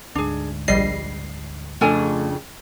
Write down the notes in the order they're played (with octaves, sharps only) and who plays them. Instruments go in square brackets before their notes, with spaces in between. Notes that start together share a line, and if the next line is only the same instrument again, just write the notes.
[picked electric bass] D2 G#2 [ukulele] D4 G#4
[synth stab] A#1 G3 C7 [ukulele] D#5
[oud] F2 C#3 D4 [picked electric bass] A3 [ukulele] F4 A4 G#5